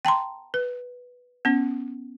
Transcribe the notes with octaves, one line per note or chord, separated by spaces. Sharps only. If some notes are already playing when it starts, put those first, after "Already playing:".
G5 A5 A#5 C6
B4
B3 C#4